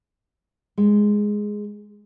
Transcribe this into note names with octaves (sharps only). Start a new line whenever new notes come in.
G#3